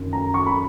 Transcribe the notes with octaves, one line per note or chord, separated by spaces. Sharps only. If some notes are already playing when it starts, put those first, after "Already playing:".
Already playing: F#2 D#3
A#5
C#6
B5